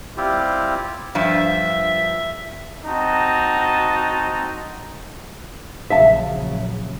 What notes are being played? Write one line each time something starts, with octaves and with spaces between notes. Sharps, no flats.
G3 C4 E4 F4 G4
G2 F3 E5
C4 D#4 F#4 A5
A#1 C#3 F#3 E5 F5 A5